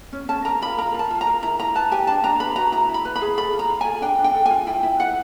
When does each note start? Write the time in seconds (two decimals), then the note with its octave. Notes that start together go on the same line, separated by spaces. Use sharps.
0.13 C#4
0.28 C#4 A5
0.45 A#4 A#5
0.62 F4 B5
0.78 A#4 A#5
0.94 F4 A5
1.11 F4
1.21 A#5
1.27 A#4
1.43 E4 A#5
1.59 E4 A#5
1.75 B4 A5
1.92 G4 G#5
2.07 D4 A5
2.24 D4 A#5
2.40 B4 B5
2.56 F#4 A#5
2.72 E4 A#5
2.89 E4
2.94 B5
3.05 B4
3.16 B5
3.21 G#4
3.37 A4 B5
3.53 F4
3.59 A#5
3.69 F4
3.81 G#5
3.86 A4
4.02 D4 G5
4.18 D4
4.24 G5
4.34 A4
4.46 G#5
4.51 F4
4.67 E4 G5
4.83 E4
5.00 B4 F#5